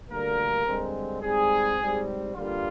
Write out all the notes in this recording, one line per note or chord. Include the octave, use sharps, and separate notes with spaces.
D2 D3 G3 A#3 A#4
G2 D3 G#3 C4
G#2 G3 C4 G#4
G#2 G3 C4
G2 D3 G3 A#3 F4